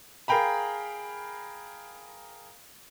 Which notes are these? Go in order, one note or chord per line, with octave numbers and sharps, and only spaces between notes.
G#4 A#4 F5 G5 A#5 B5